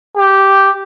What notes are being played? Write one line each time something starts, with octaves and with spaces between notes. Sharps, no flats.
G4